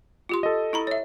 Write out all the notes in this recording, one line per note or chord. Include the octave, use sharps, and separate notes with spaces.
F4 G4 C6
A4 D#5
E4 A#5 B5
C#5 E5